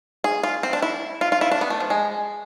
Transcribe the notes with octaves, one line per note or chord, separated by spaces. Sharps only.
G#4
F4
C4
D4
E4
F4
F4
E4
D4
B3
A3
F3
G#3